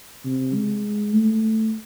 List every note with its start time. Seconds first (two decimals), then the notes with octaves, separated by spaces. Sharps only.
0.25 C3
0.54 G#3
1.13 A3